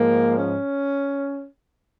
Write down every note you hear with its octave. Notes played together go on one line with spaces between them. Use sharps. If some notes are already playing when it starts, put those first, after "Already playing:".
Already playing: G#2 F3 A#3
C#4